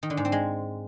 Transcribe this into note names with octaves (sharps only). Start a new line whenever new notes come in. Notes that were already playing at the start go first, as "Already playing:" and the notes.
D#3
D3
G#2
C4
G#3